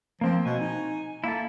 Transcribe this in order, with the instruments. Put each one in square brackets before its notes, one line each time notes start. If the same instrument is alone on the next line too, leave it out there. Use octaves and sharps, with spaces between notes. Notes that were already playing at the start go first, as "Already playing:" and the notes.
[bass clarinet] F3 [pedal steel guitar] A#3 C4
[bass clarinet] B2 [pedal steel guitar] G#5
[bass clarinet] D#4
[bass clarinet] A#3 [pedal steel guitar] E4 A4